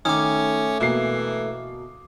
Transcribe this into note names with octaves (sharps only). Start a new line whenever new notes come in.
D#3 A3 C#4 D6 D#6
B2 E3 A#3 C7